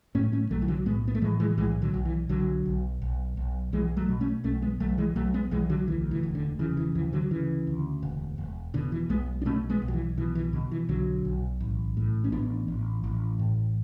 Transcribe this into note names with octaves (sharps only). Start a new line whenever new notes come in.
A2 A3 C#4
A3 C#4
B1 F#3 A3
E3
D3 F#3
A2 G#3 B3
B3
A3
A2 E3 G#3
E3 G#3
B1 E3 G#3
D3 F#3
B1
E3
B1 D3 F#3
B1
B1
B1
B1 E3 G#3
F#3 A3
B2
A3 C#4
B1 A3 C#4
G#3 B3
B1 F#3 A3
E3 G#3
B1 F#3 A3
G#3 B3
B1 E3 G#3
D3 F#3
D2 E3
E3
E1
D3
C#3 E3
E3
D2 E3
D3 F#3
C#3 E3
D2
E1
E1
B2 D3
E3
B1 G#3 B3
D4
B2 A3 C#4
G#3 B3
B1
F#3
E3
B2 E3
E3
B2 D3
E3
B1 D3 F#3
B1
A1
A2
C#4
A1 B3 D4
A1
A1
A2